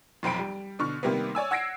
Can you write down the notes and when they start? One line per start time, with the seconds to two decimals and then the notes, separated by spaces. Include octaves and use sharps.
0.23 F1 B1 C4 B5 D7
0.39 G3
0.79 B2 D3 C#6 F6
1.03 C3 D#3 G3 A#3 B3
1.35 C#5 D5 G#5 E6
1.51 F#5 E6 G#6 A#6 C7 D7